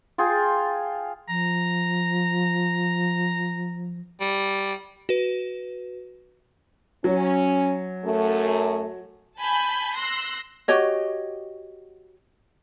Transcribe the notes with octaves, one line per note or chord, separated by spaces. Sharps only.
F4 G#4 G5
F3 A#5
G3
F#4 B4
F#3 C#4
F#2 A3
G#5 A5 B5 G6
C6 E6 F#6 A#6
F#4 G4 C#5 D#5